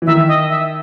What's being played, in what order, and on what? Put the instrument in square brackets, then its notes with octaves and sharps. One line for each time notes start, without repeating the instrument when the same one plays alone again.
[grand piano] E3
[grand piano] D#3 [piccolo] E5
[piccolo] D#5
E5